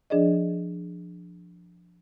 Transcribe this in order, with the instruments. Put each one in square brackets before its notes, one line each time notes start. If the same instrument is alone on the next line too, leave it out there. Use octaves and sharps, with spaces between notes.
[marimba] F3 D4 G#4 D5 D#5